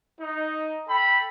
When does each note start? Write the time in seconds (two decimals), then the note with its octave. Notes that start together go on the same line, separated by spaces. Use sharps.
0.21 D#4
0.88 A4 G5 B5